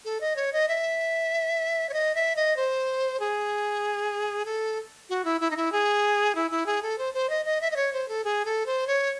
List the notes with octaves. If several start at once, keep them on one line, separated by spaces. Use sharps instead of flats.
A4
D#5
C#5
D#5
E5
C#5
D#5
E5
D#5
C5
G#4
A4
F#4
E4
E4
D#4
E4
G#4
E4
E4
G#4
A4
C5
C5
D#5
D#5
E5
D#5
C#5
C5
A4
G#4
A4
C5
C#5